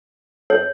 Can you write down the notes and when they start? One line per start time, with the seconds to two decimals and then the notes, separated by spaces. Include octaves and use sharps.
0.50 C#5